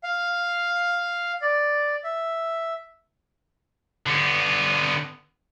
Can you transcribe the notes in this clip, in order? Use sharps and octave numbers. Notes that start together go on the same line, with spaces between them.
F5
D5
E5
D3 B3